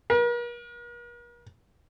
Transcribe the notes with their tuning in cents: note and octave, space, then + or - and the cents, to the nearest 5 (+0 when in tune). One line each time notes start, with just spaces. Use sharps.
A#4 +45